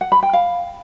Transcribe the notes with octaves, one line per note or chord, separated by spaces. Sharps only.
F#5
B5
G5
F5